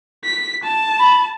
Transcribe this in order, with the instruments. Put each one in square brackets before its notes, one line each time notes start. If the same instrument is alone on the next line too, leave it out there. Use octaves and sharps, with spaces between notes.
[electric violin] B6
A5
[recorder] B5